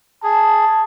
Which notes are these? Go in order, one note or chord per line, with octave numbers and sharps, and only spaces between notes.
G#4 A5